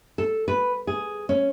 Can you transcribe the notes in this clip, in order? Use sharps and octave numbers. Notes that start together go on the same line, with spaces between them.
A4
B4
G#4
C#4